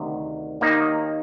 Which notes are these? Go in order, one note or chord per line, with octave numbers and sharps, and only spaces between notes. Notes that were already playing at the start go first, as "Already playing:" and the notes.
Already playing: D2 C3 D#3
D#2 D#3 A#3 D#4